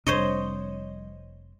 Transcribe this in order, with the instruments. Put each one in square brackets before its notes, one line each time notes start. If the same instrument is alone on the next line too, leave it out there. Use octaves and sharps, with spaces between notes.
[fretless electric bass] F1 C3 D4 [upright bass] F3 G3 [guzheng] C5 C#5 D#5